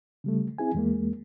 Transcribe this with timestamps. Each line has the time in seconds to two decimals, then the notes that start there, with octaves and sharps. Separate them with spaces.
0.24 C#3 G3 A3
0.58 C4 E4 G#4 G#5
0.75 E2 G#3 A#3